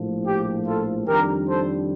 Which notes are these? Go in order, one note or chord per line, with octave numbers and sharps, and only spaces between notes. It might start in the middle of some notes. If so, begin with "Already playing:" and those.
Already playing: A#1 A2 F3
G4
F4 A4
F2 D#3 G3 D4 G4 A#4
A4 C5